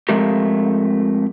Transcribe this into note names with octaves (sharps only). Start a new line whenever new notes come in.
F2 G#3 A3 G4 A#4